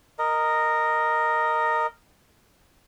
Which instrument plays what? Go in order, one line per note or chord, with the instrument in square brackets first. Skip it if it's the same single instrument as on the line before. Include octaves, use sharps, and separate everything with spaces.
[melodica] A#4 D#5